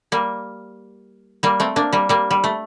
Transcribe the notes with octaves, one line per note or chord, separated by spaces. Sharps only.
G3 A#3
G3 A#3
A3 C4
A#3 D4
G3 A#3
G3 A#3
G3
A3